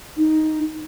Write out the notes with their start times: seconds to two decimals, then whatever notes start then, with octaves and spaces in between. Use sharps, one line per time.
0.17 D#4